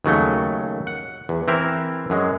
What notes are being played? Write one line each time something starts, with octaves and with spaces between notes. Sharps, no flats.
D#2 C#3 F#3 A3
F#5
E2
E3 C4 E4 A#4
F#2 F#3 G#3